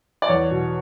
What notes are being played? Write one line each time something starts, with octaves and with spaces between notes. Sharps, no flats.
D5
E2 C#5
B2